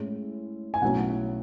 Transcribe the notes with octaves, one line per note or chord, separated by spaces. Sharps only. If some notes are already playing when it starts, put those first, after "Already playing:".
Already playing: A2 G#3 C#4 E4
G#5
B1 A2 F#3 C#4 F#5